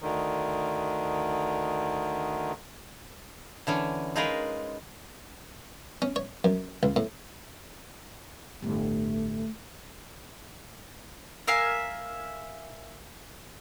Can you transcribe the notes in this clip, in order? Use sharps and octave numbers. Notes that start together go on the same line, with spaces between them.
D2 D3 D#3
D3 E3 C#4
G#3 D#4 F4 G#4 A#4 B4
C#4
C#5
F#2
C#2
A2
G1 A2 A3
A#4 E5 F5 G#5